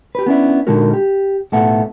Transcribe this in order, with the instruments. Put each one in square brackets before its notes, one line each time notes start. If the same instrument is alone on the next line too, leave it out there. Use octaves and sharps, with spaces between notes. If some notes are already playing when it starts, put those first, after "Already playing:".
[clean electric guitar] G4 B4
B3 C#4 D4 E4
A#2 D3 G#3 D#4 F#4 A#4
G4
B1 A2 B3 A4 E5 F#5